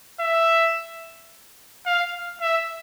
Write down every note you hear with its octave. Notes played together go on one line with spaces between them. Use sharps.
E5
F5
E5